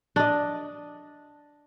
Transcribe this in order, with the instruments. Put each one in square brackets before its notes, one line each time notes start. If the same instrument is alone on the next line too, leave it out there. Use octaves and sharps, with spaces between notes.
[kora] D4 D#5